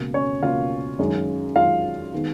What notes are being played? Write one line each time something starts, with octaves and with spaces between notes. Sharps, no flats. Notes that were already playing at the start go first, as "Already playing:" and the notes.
Already playing: C#2 B2 A#3
C#4 C#5
C#2 B2 A#3 F4 F5
F#2 D#3 G#3
F#2 D#3 G#3 F4 F5
D#3 G#3 B3